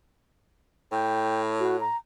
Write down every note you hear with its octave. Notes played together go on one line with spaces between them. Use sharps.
A2 G5
F#4
A#5